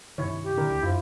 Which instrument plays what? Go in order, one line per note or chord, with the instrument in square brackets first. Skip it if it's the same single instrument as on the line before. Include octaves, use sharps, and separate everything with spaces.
[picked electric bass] G2 C3 D#3 [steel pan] E4 C#5
[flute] G4
[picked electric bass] A#2 D3 D#3 [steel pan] D4 E4 A#4
[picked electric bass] D2
[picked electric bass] F#2 [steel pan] E4 F4 C5